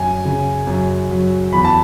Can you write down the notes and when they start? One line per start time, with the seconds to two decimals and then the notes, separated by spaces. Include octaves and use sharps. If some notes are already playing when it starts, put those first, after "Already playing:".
Already playing: F#2 G#5
0.25 C#3
0.67 F#2
1.11 F#3
1.53 E2 B5
1.65 A5